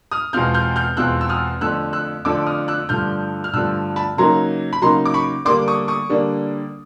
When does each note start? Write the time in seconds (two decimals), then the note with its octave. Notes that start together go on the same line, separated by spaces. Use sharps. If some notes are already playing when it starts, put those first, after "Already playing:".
0.12 D#6 F6
0.33 E2 B2 G#3 C4 F4 F6 G6
0.54 F6 G6
0.76 F6 G6
0.97 E2 B2 G#3 C4 F4 E6 F#6
1.21 E6
1.29 D#6 F6
1.61 F2 D3 F3 A3 E6 F#6
1.93 E6 F#6
2.25 F2 D3 F3 A3 D6 E6
2.47 D#6 F6
2.68 E6 F#6
2.89 G2 D3 F3 A3 F6 G6
3.44 F6
3.53 G2 D3 F3 A3 E6 F#6
3.96 A5 B5
4.17 C#3 F#3 A#3 D#4 A#5 C6
4.73 B5
4.82 C#3 F#3 A#3 D#4 A#5 C6
5.06 D6
5.14 B5 C#6
5.45 D3 G3 A#3 D4 C6 D6
5.68 C#6 D#6
5.88 C#6 D#6
6.10 D3 G3 A#3 D4